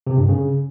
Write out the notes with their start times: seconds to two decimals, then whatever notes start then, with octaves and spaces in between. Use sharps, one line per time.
0.07 C3
0.18 G2
0.29 C#3